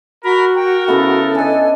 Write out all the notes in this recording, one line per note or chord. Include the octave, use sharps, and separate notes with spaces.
F#4 A#4 B5
A#4 G5
C#3 B3 E4 A4
D4 D#5 G#5